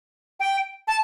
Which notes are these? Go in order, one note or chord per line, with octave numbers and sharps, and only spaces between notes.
G5
A5